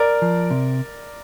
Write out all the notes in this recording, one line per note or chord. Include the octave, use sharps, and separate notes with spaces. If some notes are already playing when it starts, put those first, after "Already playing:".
Already playing: A#4 D5
F3
C3